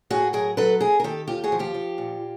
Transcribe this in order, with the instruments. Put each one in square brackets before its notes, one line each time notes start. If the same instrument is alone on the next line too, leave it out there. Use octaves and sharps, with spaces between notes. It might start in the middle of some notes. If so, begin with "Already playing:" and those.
[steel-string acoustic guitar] A2 F#4 G#4
F#3 G#4 A#4
F#3 A4 B4
F#2 G#4 A#4
A#4
D#3 G4 A4
D#2 F4 G4
F#4 G#4
F3
F4 G4
F3
A#2